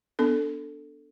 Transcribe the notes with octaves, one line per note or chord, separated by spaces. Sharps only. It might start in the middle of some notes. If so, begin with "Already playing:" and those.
B3 D4 A4